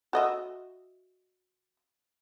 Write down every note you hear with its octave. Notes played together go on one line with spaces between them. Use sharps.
F#4 D#5 E5